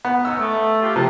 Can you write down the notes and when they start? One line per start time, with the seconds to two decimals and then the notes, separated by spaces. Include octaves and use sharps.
0.05 B3
0.25 C#4 D#4 E6
0.39 A3
0.82 F4 G4
0.96 C3 F3 A5